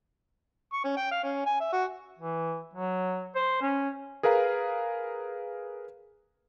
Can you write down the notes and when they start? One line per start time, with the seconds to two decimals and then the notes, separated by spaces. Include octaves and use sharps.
0.73 C#6
0.85 C#4
0.97 G5
1.11 F5
1.24 C#4
1.46 G#5
1.61 E5
1.73 F#4
2.19 E3
2.74 F#3
3.35 C5
3.62 C#4
4.23 G#4 A#4 B4 F5 A#5